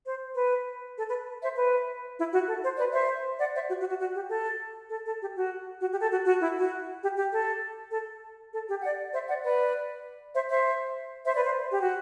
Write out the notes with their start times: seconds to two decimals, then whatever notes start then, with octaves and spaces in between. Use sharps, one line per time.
0.05 C5
0.35 B4
0.97 A4
1.07 B4
1.42 C5 E5
1.56 B4
2.16 E4
2.32 F#4
2.47 A4
2.62 C5
2.77 B4 D5
2.92 C5 E5
3.37 D5 F#5
3.53 C5 E5
3.68 F#4
3.79 F#4
3.89 F#4
3.99 F#4
4.14 G4
4.28 A4
4.89 A4
5.05 A4
5.20 G4
5.35 F#4
5.80 F#4
5.90 G4
6.00 A4
6.10 F#4
6.25 F#4
6.41 E4
6.56 F#4
7.02 G4
7.16 G4
7.32 A4
7.91 A4
8.53 A4
8.68 G4
8.82 D5 F#5
9.12 C5 E5
9.28 D5 F#5
9.43 B4 D5
10.34 C5 E5
10.49 C5 E5
11.25 C5 E5
11.35 B4 D5
11.45 C5
11.70 G4
11.81 F#4